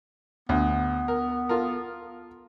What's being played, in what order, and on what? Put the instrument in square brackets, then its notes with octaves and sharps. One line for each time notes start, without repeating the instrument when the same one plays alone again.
[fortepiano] D2 [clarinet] B3
[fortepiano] A#4
F4 A4 A#4